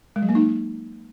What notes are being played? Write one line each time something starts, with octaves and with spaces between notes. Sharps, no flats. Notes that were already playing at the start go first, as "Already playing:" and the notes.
G#3
F#3
A#3
D#4